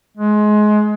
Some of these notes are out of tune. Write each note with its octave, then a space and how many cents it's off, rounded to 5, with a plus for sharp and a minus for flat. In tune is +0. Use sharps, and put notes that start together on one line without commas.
G#3 +25